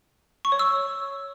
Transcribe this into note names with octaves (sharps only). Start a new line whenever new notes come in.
C#6
C#5
E6